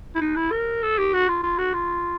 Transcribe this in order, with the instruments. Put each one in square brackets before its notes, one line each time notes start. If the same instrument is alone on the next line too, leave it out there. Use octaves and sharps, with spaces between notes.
[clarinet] E4
D#4
E4
A#4
A4
G4
F#4
F4
F4
F#4
F4